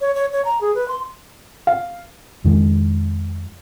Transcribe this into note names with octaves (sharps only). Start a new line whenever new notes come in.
C#5
C#5
C#5
A#5
G#4
B4
C6
F5
F2 D#3 G#3